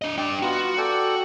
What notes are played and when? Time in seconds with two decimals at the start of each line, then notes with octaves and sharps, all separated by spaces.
0.02 D4 D#5
0.18 D4 D5 G5
0.42 B3 F4 F#4 A#5
0.78 A4 D5 G5